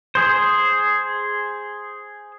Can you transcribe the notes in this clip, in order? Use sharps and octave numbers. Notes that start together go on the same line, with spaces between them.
G#4 C5